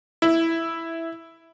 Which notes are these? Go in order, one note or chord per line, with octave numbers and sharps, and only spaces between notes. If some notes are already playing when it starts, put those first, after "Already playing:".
E4